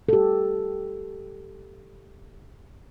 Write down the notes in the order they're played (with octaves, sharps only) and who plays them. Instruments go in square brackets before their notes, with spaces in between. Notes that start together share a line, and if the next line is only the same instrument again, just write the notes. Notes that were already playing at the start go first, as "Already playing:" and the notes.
[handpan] G4 A4